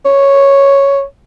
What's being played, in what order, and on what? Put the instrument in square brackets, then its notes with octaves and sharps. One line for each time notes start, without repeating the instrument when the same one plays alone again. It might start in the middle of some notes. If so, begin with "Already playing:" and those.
[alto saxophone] C#5